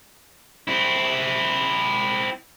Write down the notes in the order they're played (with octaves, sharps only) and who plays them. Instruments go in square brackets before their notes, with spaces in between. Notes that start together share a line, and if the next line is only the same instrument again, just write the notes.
[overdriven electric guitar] C4 E4